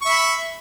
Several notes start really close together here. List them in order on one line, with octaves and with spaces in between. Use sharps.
C#6 E5 B5